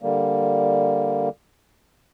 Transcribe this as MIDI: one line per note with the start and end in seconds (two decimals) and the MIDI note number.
0.02 1.29 50
0.02 1.29 55
0.02 1.29 58